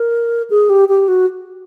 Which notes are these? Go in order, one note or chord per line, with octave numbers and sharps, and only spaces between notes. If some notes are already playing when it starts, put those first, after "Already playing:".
Already playing: A#4
G#4
G4
G4
F#4